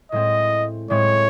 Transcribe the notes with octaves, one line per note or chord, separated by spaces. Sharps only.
A2 G#3 C4 D#5
A2 G#3 C4 C#5